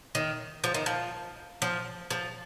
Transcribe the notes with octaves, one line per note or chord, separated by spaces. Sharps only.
D#3
F3
D#3
F3
F3
F3